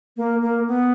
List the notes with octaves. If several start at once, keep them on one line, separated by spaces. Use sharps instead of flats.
A#3
A#3
B3